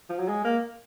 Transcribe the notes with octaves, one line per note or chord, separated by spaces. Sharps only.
F3
F#3
G#3
A#3